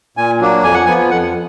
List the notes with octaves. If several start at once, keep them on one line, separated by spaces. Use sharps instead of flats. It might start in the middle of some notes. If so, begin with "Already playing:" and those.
A#2 G#5
F#3 A#3 D4
F2 G#5
F#5
F3 B3 G#5
F2 F#5